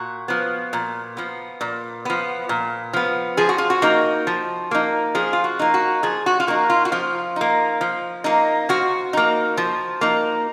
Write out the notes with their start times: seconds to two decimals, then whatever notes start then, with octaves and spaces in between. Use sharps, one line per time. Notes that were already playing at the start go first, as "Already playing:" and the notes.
Already playing: A#2 F#4
0.28 F3 B3
0.73 A#2
1.17 F3 B3
1.61 A#2
2.05 F3 B3
2.49 A#2
2.93 F3 B3
3.37 F3 G#4
3.49 F#4
3.58 F4
3.70 F#4
3.82 A#3 D#4
4.27 F3
4.71 A#3 D#4
5.15 F3 G#4
5.33 F4
5.44 F#4
5.59 A#3 D#4
5.74 F#4
6.03 F3 G#4
6.26 F#4
6.40 F4
6.47 A#3 D#4 F#4
6.70 F4
6.85 F#4
6.92 F3 F4
7.36 A#3 D#4
7.81 F3
8.24 A#3 D#4
8.69 F3 F#4
9.13 A#3 D#4
9.57 F3
10.01 A#3 D#4